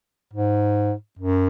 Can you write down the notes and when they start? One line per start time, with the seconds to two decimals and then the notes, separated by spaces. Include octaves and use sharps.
0.33 G#2
1.19 F#2